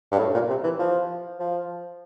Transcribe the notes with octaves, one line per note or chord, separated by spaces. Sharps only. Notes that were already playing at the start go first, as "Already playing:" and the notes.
G2
A2
A#2
C3
E3
F3
F3